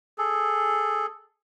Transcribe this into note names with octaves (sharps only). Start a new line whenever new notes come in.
G#4 A4